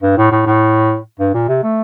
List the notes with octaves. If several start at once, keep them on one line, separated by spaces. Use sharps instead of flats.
G2
A2
A2
A2
G2
A#2
C3
A3